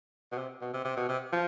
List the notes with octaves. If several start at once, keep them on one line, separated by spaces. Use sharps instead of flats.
B2
C3
B2
C3
C3
B2
C3
F3